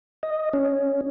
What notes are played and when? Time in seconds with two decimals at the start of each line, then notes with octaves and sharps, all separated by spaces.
0.23 D#5
0.53 C#4